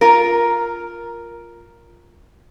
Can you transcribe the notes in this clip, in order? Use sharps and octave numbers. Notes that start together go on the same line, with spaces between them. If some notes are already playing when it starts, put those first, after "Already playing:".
F4 A#4